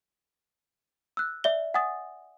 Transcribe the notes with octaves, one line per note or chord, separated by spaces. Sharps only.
E6 F#6
D5 E5 G7
F#5 G#5 D#6 A6